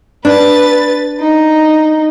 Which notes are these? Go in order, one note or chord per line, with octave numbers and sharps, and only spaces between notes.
D4 B4 A6
D#4